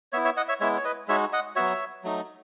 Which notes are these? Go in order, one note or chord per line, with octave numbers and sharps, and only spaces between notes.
B3 E4 C#5 E5
C#5 E5
D#5 F#5
C#5 E5
G#3 B3 E4 C#5 E5
C#5
B4 D#5
G#3 D#4 F#4 C#5 E5
D#5 F#5
F#3 B3 F#4 C#5 E5
F#3 A3 D#4